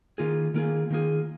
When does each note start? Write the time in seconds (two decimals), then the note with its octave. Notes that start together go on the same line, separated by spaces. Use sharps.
0.18 D#3 A#3 F4 G#4
0.54 D#3 A#3 F4 G#4
0.90 D#3 A#3 F4 G#4